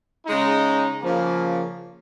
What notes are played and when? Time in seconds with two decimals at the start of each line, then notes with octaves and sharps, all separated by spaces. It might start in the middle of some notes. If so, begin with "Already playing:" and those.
0.26 C#3 G#3 D#4
1.03 C#3 F3 A#3